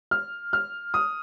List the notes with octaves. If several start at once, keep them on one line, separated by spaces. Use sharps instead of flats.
F6
F6
D#6